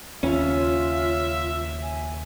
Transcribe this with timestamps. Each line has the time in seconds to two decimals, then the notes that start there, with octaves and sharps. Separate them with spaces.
0.23 D#2 C#3 C#4 F4 E5
1.83 G#5